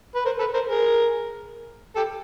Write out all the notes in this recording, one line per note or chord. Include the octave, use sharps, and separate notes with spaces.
B4
A#4 C5
A4 B4
A#4 C5
G#4 A#4
G4 A4